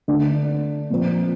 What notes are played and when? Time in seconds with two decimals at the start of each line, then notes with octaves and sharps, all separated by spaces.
0.08 D3 A3 D4
0.90 A#2 F3 C4